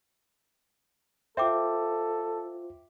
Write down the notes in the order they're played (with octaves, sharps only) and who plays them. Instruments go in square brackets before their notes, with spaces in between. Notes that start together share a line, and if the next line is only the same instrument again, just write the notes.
[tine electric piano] F4 C5 [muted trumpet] A4 [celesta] E5 G5 D6